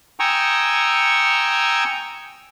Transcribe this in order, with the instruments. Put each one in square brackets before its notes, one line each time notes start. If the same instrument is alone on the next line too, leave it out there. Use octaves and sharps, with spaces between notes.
[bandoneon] G5 G#5 A#5 C#6 D#6 E6